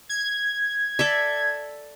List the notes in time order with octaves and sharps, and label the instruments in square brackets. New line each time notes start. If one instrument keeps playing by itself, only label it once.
[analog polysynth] G#6
[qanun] A4 D5 E5